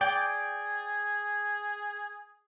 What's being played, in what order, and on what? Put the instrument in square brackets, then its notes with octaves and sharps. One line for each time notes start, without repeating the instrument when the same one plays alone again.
[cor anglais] G#4 [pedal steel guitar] D5 G5